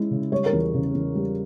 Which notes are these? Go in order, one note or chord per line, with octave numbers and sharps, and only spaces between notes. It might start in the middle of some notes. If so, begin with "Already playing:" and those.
Already playing: G#3 C#4 E4
C#3
G3 C#5
A#4
E2
C#3
E2
G3